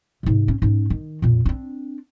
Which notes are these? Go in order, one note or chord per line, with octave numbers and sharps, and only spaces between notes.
G#2 C3
C#4
G#2 C#4
D#3
F2 A#2
C4 D4